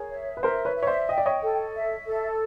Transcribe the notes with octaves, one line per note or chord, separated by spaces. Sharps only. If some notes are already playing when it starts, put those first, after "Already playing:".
Already playing: G#4 A#4 C#5
E5
B4
A#4 C5 E5
B4 C#5
E5
C#5
C5 D5
D#5 G5
D5
C#5 D#5
A4
E5
A4